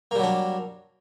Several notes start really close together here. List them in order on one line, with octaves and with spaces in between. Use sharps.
A#3 G3 F#3 D4